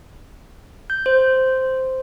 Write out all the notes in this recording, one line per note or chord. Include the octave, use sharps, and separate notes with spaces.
G6
C5